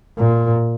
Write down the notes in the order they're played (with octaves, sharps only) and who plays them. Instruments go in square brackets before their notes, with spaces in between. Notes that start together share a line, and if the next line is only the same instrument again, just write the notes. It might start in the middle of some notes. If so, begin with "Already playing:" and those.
[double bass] A#2